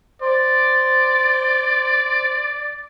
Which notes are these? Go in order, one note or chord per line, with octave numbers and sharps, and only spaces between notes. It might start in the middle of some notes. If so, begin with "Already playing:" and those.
C5 D5